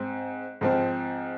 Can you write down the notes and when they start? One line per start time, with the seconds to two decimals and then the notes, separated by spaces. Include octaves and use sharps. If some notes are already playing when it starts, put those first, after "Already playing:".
Already playing: G#2 C4
0.61 G#2 F3 C4